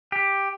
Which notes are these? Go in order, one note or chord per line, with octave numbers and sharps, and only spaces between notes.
G4